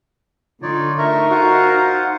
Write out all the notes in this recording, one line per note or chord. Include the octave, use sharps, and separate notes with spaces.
D3 D#4 F4 C#5 D5
A3 D#4 A#4 E5 C#6
F4 F#4 C5 F#5